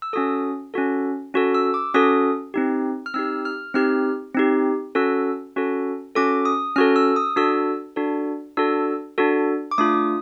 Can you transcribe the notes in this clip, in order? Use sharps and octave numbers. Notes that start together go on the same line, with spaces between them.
E6
C#4 F#4 A4 D#6
C#4 F#4 A4
C#4 F#4 A4
E6
D6
C#4 F#4 A4 D#6
C4 D#4 G4
F6
C4 D#4 G4 E6
F6
C4 D#4 G4 F6
C4 D#4 G4
C#4 F#4 A4 E6
C#4 F#4 A4
C#4 F#4 A4 D6
D#6
C#4 F#4 A4 F6
E6
D#6
D4 F#4 A4 E6
D4 F#4 A4
D4 F#4 A4 E6
D4 F#4 A4
D6
A3 D4 F4 D#6